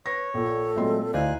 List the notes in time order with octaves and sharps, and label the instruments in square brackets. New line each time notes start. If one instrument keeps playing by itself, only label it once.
[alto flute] B4 [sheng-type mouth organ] C#5 [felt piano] A#6
[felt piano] A#1 A#2 [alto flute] A4
[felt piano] A#2 C4 C6 [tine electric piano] F#3 G#3 A3
[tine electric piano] D2 C5 D5 [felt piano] D#4 E4 [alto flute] F5 [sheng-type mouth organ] G#5 F#6